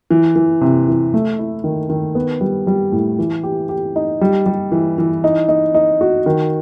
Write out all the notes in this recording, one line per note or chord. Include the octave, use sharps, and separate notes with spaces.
E3
E3
C3
E3
A3
E4
D#3
D#3
B3
G3
G3
A2
E3
G4
G4
D#4
G3
G3
E3
E3
D#4
D#4
D#4
F#4
D#3